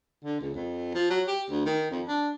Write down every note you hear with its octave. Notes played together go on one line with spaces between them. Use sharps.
D3
C#2
F2
F3
F#3
G4
D2
D#3
F2
D4